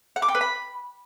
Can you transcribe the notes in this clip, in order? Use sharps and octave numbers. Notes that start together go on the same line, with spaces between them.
F#5
D6
G5
B4
B5